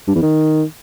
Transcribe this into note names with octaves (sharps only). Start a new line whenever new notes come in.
G2
E2
D#3